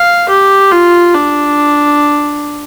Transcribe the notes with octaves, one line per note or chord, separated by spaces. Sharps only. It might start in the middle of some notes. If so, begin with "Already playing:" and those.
Already playing: F5
G4
F4
D4